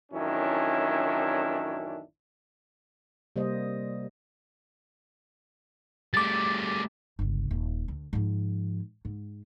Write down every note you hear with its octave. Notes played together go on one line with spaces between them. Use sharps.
A1 F#2 D#3 C#4 D4 E4
C3 G3 A#3 C5 D#5
G3 A3 D6 A6
G1 C#2
D#1
D2
G#2 F3
G#2